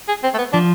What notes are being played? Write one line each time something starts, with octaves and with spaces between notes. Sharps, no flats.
G#4
C4
A3
B3
F3 D4